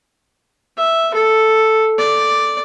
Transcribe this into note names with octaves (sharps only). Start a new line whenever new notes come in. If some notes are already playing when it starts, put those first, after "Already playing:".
E5
A4
D5